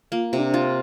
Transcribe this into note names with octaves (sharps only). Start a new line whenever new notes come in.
A#3 F4
C3
D4
F4